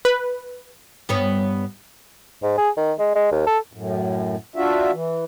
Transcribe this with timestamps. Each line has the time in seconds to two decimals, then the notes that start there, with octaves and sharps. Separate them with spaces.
0.05 B4
1.09 G2 B3 C#5
2.43 G#2
2.58 G#4
2.77 D#3
2.99 G#3
3.15 G#3
3.32 D#2
3.46 A4
3.73 F#2 A2
4.56 D4 F4 F#4 E5
4.92 E3